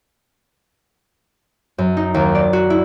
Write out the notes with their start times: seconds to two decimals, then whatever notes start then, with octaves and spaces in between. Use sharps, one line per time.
1.78 F#2
1.97 D#4
2.14 D#2
2.35 D5
2.53 F#4
2.70 E4